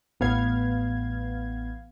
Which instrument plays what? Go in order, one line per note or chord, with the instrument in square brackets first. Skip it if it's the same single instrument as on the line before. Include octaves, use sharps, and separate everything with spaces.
[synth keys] A1 B3 F5 G#6